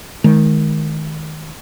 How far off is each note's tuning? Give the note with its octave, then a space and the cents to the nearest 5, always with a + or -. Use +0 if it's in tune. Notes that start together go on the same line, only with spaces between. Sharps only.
D#3 +5 G#3 +35